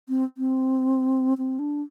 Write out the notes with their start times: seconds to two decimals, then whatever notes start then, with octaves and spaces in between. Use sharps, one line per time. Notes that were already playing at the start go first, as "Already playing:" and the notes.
0.09 C4
0.38 C4
1.38 C4
1.59 D4